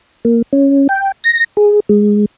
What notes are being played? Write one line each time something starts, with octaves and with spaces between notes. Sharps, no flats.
A#3
C#4
G5
A#6
G#4
G#3